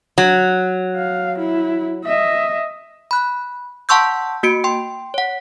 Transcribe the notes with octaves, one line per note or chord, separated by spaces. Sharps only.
F#3
F5
E4
D#5 E5
B5 F#6
F#5 A5 C6 C#6 E6 G6
A#3 F#4 C#7 D7
G5 C6
C#5 F#5